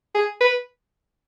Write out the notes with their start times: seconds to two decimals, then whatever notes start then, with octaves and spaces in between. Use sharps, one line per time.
0.15 G#4
0.40 B4